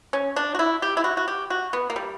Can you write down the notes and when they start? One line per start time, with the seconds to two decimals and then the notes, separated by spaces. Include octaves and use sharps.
0.13 C#4
0.36 D4
0.55 F#4
0.59 E4
0.82 G4
0.97 E4
1.04 F#4
1.17 F#4
1.28 G4
1.50 F#4
1.73 B3
1.90 A#3
1.96 G3